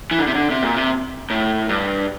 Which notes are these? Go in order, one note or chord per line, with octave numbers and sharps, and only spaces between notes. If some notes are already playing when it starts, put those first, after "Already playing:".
E3
D3
C3
D3
C3
A#2
C3
A2
G2